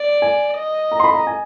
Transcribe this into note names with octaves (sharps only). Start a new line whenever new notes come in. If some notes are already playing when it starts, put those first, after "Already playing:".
Already playing: D5
G#5
D#5
A#5
C6
B5
A#5
G#5